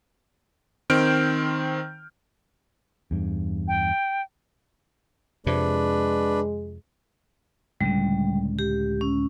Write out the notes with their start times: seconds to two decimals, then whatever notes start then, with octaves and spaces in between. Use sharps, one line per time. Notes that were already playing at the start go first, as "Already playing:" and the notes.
0.90 D#3 C4 F6 G6 D7
3.11 E2 G2
3.68 G5
5.46 F2 C3 G#3 D4 B4
7.81 C#2 A2 D3 G3
8.59 G4
9.01 C#4